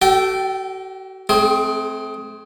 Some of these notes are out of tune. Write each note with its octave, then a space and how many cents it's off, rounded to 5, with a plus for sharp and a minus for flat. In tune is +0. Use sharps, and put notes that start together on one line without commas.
F#4 +40 A4 +0 G5 -15
A3 -35 C4 +0 G#4 +15